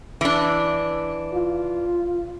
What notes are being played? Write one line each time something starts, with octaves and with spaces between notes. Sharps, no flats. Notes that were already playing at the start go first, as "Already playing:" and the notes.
E3 D4
F4